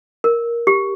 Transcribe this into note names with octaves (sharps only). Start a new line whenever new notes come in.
A#4
G4